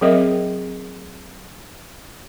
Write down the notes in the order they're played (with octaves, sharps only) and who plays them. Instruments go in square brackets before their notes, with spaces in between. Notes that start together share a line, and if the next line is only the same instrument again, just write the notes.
[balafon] F#3 C4 G#4 A#4 D#5 E5